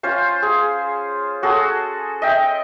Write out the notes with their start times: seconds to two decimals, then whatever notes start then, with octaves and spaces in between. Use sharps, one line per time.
0.03 C#4 F4 C5
0.42 G#4
1.42 C#4 F#4 G#4 A4
2.22 D#5 E5 G5